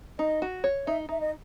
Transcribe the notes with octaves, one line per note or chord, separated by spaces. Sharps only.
D#4 D#5
F#4
C#5
D#4 E5
D#4 E5
D#5